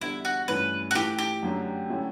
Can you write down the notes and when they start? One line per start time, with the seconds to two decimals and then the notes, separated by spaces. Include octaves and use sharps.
0.01 E2 D3 G3 D4 E4
0.25 F#4
0.48 G2 E3 A3 C#4 B4
0.91 F#4
0.95 E3 A3 E4 G4
1.19 G4
1.43 F#2 D3 F#3 A3 D4
1.89 D3 F#3 A3 C#4 E4